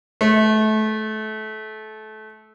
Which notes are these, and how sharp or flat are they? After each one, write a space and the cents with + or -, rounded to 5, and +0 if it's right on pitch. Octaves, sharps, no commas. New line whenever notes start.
A3 -25